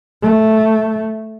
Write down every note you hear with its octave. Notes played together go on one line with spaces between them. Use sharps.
A3